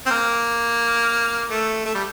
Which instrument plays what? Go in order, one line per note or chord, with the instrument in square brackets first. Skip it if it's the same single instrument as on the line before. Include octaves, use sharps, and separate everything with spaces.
[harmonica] C4
A#3
A3
A3
G3